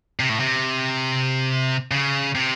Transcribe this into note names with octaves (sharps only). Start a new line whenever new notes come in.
C3
A2
C3
C#3
C3